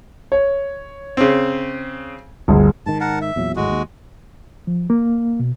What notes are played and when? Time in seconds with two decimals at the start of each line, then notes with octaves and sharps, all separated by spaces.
0.32 C#5
1.17 C#3 C4
2.48 G1 D2 G#4
2.86 G#2 D#3 A5
3.00 A#4 F#5 A5
3.22 E5
3.36 E2 A#2 F#3
3.56 D1 G#1 A2 G#3 F#4
3.71 D#2
4.67 F3
4.90 A#3
5.39 B2